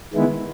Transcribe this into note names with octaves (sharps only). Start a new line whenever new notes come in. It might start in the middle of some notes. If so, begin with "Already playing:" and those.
D#3 G#3 B3 E4